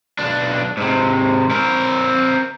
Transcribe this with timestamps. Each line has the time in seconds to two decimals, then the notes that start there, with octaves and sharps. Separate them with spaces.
0.19 B1 D4
0.77 G#2 C3
1.51 C4 A#4